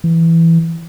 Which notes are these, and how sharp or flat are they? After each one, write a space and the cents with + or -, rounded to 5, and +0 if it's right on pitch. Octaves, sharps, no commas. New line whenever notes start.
E3 +5